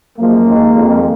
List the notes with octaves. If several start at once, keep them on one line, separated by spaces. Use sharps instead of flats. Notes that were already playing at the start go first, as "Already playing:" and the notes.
F#2 F3 G#3 A#3
D#2 D#3 G#3
F2 F3 G#3